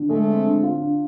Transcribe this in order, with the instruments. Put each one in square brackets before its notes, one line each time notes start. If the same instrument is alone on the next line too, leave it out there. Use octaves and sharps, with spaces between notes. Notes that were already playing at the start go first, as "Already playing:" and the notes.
Already playing: [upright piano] D3
[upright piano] G#3 [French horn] A3
[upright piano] C4
D3
F4
D4